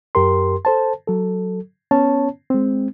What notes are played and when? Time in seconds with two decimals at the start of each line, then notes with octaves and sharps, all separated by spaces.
0.15 F#2 G4 A#4 C6
0.65 A4 C5 A5
1.07 F#3 A4
1.91 B3 C#4 C#5 A5
2.50 G#3 C4